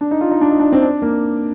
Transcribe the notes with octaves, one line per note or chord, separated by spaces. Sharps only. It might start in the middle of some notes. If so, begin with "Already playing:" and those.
D4
D#4
F4
D#4
D4
D#4
D4
C4
D4
A#3